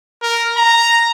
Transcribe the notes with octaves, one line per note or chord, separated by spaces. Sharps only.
A#4
A#5